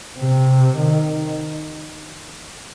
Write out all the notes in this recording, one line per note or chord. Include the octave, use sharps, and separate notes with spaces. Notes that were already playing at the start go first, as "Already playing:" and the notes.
C3
D#3